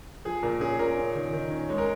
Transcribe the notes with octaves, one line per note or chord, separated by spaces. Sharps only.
F3 G#4
A#2 A#4
C#4 G#4
A#2 A#4
C#4
D#3
D#3
C#4
G#3 C#5
A#4